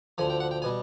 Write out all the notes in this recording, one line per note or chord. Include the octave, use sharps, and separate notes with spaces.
D2 D3 F3 G#5
G5
F#5
G5
B2 G3 G#5